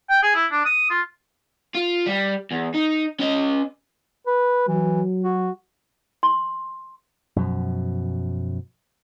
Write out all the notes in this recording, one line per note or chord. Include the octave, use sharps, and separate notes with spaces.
G5
G#4
E4
D4
D#6
F4
F4
G3
E2
D#4
C#4 D#5
B4
E3 F#3
F#4
C6
F#2 B2 F3